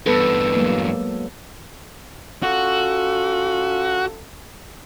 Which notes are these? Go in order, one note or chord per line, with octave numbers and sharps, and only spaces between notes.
E2 G2 B3 A4 B4
F#3 G#3 A#3
C#4 F4 F#4 A4